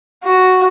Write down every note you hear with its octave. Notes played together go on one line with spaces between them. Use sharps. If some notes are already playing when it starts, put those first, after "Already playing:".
F#4